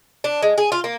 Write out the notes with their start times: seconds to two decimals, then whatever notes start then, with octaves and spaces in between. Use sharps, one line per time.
0.24 D4
0.42 G#3
0.58 G#4
0.72 F4
0.84 A#3